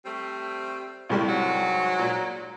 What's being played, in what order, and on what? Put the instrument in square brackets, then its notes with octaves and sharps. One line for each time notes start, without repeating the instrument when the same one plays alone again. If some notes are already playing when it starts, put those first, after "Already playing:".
[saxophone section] G3 A3 C4
[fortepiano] C2 A2 G3 [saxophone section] F2
[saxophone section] G#2 F#3
[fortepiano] A#2